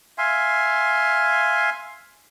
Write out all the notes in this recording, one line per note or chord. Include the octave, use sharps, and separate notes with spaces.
E5 F5 G#5 C6